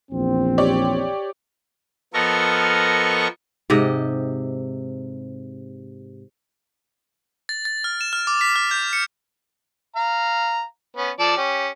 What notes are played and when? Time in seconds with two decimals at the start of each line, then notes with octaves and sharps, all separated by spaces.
0.12 A#1 E2 C4
0.58 G4 C#5 D5
2.14 F3 B3 A4 A#4 D#5 C#6
3.70 G#2 C3 G4 D#5
7.49 A6
7.65 A6
7.84 F6
8.01 E7
8.13 F6
8.27 D6
8.41 B6
8.56 F6
8.71 G6
8.93 C#7
9.96 F5 A#5
10.96 B3 C#4
11.19 F3 A4 D5
11.37 C#4 G4